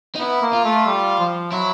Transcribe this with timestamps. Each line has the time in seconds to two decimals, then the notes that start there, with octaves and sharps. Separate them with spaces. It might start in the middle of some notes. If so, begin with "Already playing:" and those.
0.15 D#4
0.19 B3 E4
0.42 A#3
0.53 F4
0.64 A3
0.86 G3
1.19 F3
1.52 F#3 E4